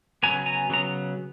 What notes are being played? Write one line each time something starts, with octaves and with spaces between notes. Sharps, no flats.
C#3 F#3 B3 G#5 A#5
G#5 A#5
C#3 F#3 B3 A#5